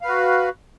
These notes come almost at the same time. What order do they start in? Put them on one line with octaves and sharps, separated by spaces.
F5 B4 F#4